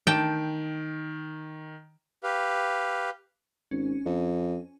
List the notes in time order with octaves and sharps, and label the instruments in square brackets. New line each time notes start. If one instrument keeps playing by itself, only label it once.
[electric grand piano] D#3 D7 [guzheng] G5 A5
[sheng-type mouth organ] G4 B4 F5
[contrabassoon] G#1 [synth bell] C#4
[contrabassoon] F2